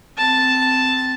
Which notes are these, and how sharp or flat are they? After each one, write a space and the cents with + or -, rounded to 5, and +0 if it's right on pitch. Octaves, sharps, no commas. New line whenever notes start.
C4 -15 A5 +0